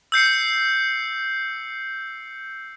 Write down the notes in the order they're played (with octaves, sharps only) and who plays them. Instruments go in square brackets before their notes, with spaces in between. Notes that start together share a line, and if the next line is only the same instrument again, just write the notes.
[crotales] E6 G6 C7 C#7